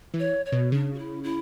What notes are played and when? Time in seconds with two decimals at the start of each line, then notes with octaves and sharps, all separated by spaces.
0.14 E3
0.19 C#5
0.46 C#5
0.52 B2
0.72 C#3 D4
0.94 F#4
0.99 E4
1.24 E4